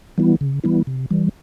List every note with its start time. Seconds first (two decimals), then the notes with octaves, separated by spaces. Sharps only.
0.18 E3 G3 B3 E4
0.41 C#3
0.64 E3 G3 B3 E4
0.87 C3
1.11 E3 G3